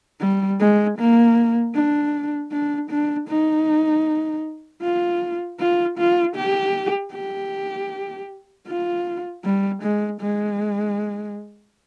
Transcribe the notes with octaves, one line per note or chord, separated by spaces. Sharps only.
G3
G#3
A#3
D4
D4
D4
D#4
F4
F4
F4
G4
G4
F4
G3
G#3
G#3